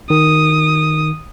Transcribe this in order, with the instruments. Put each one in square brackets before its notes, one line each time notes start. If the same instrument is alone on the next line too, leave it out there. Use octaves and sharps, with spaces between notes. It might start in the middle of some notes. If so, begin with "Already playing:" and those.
[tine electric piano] D#3 [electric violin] D#6